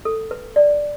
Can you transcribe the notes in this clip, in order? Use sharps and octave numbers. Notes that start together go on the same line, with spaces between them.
A4
B4
D5